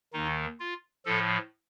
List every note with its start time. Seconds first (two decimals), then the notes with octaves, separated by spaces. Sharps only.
0.13 D#2 D#3 D#4
0.60 F4
1.06 A2 F3 A4